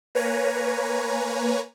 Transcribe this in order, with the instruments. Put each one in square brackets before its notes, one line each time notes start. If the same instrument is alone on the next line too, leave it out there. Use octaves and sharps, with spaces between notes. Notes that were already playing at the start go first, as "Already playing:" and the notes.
[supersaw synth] A#3 B4 C#5 G#5 A#5